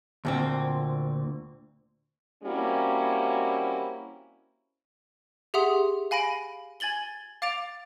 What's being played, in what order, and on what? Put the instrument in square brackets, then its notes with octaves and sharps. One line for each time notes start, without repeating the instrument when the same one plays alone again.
[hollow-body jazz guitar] D2 A#2 C4
[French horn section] G3 A#3 C4 C#4 E4 F#4
[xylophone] G4 G#4 E5 F#5 C6 D#6
F5 G#5 B5 A#6 D7
G#5 G#6 A6 F#7 G7
F5 D6 A6 D7 F7